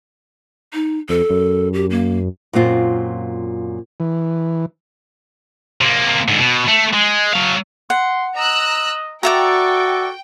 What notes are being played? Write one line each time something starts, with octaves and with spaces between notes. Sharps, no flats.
D#4
F2 A4
F#2
G4
A#3
F#2 A#2 C4 F4
E3
C3 A#3
G#2 D3
B2
A3
G#3
F#3 F5
F#5 C6
D#5 A#5 E6 F#6
F#4 A4 D5 E5 G5 A#5